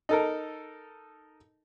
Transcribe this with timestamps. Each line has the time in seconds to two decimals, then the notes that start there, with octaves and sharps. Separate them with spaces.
0.09 D#4 A4 A#4